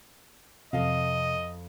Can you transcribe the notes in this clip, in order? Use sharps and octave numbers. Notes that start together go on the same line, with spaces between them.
F2 C3 A4 D#5 F5